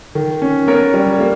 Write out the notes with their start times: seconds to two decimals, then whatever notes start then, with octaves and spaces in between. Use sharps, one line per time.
0.15 D#3
0.42 C#4
0.68 B3 A#4 C#5
0.94 G3
1.20 A#3